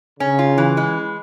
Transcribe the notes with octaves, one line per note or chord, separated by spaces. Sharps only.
C#3 C#4
F4
E3
G#3